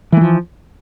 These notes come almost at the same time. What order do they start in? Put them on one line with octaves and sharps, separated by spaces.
E3 A3 F3